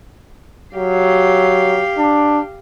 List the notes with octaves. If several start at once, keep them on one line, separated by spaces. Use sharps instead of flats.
F#3 G4 F5
D4